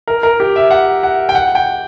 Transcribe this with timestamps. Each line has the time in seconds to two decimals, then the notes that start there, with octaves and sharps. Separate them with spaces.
0.08 A#4
0.23 A#4
0.40 G4
0.56 E5
0.70 F#5
1.03 F#5
1.29 G5
1.35 F#5
1.55 G5